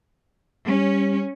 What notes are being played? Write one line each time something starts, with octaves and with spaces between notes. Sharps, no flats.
G3 C#4